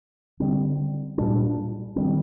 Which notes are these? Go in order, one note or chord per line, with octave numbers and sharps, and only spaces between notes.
D3 G3 C4
A#2 G3 D4
D#3 G3 C4